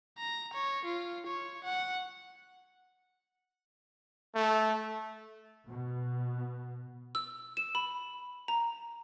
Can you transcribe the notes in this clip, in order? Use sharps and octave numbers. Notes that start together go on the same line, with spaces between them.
A#5
C#5
F4
C#5
F#5
A3
B2
E6
E7
B5
A#5